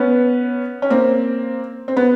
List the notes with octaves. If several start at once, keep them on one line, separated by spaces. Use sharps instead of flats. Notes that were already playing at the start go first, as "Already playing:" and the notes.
Already playing: B3 C#4
C#4
A#3 C4
C4
B3